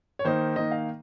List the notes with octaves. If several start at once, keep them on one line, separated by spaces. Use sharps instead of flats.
C#5
D#3 A#3 D#4 C5
D#3 A#3 D#4 D#5
F5